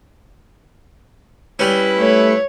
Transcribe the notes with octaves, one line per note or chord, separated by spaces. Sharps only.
G3 C#4 E4 B4
A3 C#5